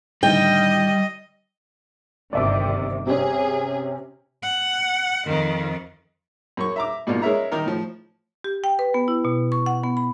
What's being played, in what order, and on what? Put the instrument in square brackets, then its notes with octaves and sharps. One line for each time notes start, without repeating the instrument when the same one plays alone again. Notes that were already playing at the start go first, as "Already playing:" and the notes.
[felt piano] A2 D3 D#3 [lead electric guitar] G3 [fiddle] D#5 [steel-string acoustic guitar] G5
[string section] G1 C3 D#3 [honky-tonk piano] D5 E5 D6
[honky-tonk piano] C3 C#4 [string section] G#4
[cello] F#5
F2 D#3
[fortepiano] F#2 C#5 C#6
E5 A#5 D6
G#2 B2 A#3 D4 F4
G#3 C#4 A#4 E5 A#5
D#3 D#4 A#4
A2 F3
[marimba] G4
G5
B4
B3
E4
B2
C#6
F#5
B3
B5